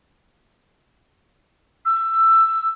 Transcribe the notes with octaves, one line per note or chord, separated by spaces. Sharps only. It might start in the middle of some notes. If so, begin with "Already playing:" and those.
E6